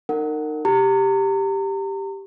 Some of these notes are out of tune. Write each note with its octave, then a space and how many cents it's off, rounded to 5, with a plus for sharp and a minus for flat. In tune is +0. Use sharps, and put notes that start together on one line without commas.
D#4 -25 A#4 -30 F#5 +0
G4 +0 A#5 -35